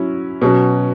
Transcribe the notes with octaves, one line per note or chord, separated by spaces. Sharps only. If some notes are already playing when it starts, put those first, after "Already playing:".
Already playing: F#3 C#4 E4
B2 F#3 C#4